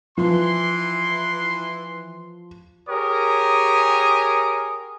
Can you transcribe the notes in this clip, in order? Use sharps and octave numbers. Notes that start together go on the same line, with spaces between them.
E3 F3 C6
G4 G#4 A#4 C#5 D#6